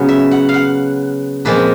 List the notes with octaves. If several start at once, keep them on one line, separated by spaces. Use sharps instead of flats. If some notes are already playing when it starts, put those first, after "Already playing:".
Already playing: C#3 F#3 B3
E5
F#5
F5
F#5
A#2 F3 G#3 C4 B4